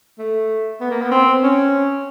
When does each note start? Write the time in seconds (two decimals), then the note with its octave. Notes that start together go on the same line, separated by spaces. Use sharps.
0.18 A3
0.81 B3
0.91 A#3
1.02 B3
1.11 C4
1.43 C#4